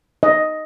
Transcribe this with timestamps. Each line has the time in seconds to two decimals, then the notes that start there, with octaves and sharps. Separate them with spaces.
0.23 D#5